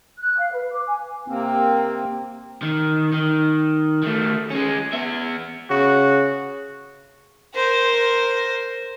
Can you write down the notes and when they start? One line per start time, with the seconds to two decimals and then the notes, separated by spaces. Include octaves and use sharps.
0.19 F#6
0.39 F5
0.52 B4
0.71 D6
0.87 G#5
1.28 C3 A#3 C4
2.62 D#3
3.12 D#3
4.03 D#3 A3
4.50 G#3 C#4
4.93 B3 E5
5.70 C#3 F#4
7.55 A#4 C5